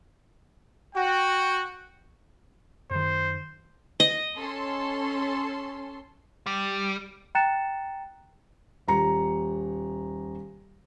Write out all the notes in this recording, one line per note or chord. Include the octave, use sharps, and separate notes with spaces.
F#4 G5
F#2 D#3 C5
D#5
C#4 A4 C6
G3
G5 A#5 F#6 A6 C#7 E7
D#1 A#5 C#7